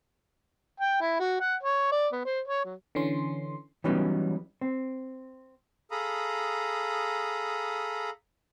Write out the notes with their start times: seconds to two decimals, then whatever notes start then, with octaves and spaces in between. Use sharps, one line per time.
0.80 G5
1.01 E4
1.20 F#4
1.41 F#5
1.63 C#5
1.92 D5
2.13 B3
2.26 C5
2.48 C#5
2.65 F#3
2.95 D3 E3 C#4 C6
3.84 E3 F#3 G3 B3 C#4 D#4
4.61 C4
5.91 G#4 A4 F5 A#5 B5 D#6